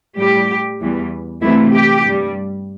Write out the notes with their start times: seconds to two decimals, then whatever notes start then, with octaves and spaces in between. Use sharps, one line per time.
0.16 A2 G3 G4
0.80 E2 E3 G3
1.42 D2 C3 E3 A3 E4
1.74 G4
2.04 G2 G3